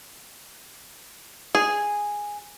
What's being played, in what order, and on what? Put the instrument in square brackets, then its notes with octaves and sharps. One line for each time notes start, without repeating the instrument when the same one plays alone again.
[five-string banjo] G#4